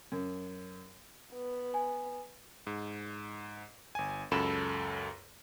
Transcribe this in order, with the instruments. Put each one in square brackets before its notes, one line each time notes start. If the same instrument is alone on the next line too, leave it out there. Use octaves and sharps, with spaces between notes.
[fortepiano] F#2
[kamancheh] B3
[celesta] G#5
[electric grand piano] G#2
G1 G#5
C#2 F#2 A4 B5 E7